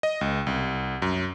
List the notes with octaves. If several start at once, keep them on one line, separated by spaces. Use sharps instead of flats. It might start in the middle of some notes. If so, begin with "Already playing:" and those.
D#5
C#2
C2
F#2